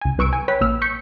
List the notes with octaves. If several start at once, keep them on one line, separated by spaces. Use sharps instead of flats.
C#2 G#5
C2 B4 C#6 E6 D7
G#5
B4 C#5 G5 B6
A#1 A#3 E6 F6
C#6 G6 B6 C#7